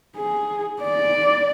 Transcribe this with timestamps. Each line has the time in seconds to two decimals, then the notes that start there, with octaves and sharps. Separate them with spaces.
0.16 G#4
0.82 D5